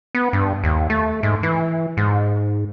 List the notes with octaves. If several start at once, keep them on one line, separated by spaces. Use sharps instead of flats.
B3
G2
D#2
A3
G#2
E3
G#2